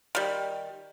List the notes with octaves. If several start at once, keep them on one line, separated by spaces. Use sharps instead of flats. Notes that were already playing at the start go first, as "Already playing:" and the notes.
D#3 G3